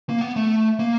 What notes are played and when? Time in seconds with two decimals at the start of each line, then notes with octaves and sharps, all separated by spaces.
0.09 A#3
0.21 B3
0.36 A3
0.80 A#3